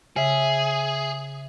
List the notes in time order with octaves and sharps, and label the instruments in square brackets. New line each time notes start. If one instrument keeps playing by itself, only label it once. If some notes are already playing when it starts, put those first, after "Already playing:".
[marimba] C#3 [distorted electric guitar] G#4 [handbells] E5 G#5